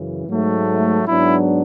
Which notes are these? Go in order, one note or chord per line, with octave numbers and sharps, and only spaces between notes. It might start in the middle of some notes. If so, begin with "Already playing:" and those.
Already playing: F#2 C#3 E3
G#2 F#3 A3
G#2 F#3 B3 D4 E4